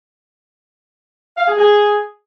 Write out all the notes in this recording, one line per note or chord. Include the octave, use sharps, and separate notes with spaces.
F5
G#4
G#4